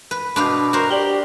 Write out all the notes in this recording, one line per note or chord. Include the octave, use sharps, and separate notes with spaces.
B4
B2 D4 B4 F5 C6 D6 G6
F#4 A#4 C5
G4 D5 F#7 G7